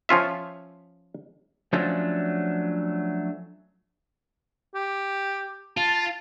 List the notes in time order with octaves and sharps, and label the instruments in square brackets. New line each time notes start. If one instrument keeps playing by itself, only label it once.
[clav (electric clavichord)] F3 C#4 F4 E5
[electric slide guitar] F3 F#3 A3 C#4 D4 F4
[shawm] G4
[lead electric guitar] F4 [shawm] A5